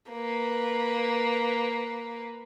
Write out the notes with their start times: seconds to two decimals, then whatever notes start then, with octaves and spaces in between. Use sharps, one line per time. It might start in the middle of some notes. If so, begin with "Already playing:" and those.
0.11 A#3 B4